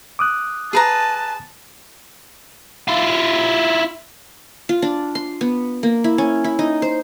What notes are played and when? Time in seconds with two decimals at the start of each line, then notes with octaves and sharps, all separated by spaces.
0.19 D6 D#6 F#6
0.73 G#4 B4 A5 A#5
2.88 E4 F4
4.69 F4
4.82 D4
5.15 C6
5.41 B3
5.83 A#3
6.04 E4
6.18 C#4
6.44 E4
6.59 D#4
6.82 C5